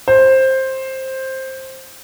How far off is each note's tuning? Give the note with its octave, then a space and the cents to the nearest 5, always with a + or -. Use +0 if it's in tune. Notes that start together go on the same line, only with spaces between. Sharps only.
C5 +10